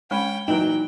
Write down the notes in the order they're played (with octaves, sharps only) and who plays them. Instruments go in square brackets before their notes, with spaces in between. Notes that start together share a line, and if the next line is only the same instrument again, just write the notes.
[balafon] G#3 B5 [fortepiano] C#4 [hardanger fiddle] G5
[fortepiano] A#2 E3 F#3 [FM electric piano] D#4 [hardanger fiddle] G5